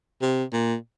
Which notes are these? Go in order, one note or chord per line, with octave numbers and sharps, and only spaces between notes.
C3
A#2